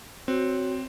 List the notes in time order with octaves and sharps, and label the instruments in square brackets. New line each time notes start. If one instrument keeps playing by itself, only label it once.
[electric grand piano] C4 [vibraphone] F#4 C#5